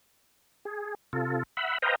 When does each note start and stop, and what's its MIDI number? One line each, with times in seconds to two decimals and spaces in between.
0.65 0.95 68
1.13 1.43 48
1.13 1.43 65
1.13 1.43 69
1.57 1.78 76
1.57 1.78 78
1.57 1.78 83
1.82 1.95 71
1.82 1.95 72
1.82 1.95 75
1.82 1.95 77
1.82 1.95 79
1.82 1.95 82